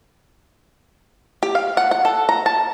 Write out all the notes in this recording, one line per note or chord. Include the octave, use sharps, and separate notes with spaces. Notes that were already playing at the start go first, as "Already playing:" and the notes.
G4
F5
F#5
F#5
A4
A#5
A5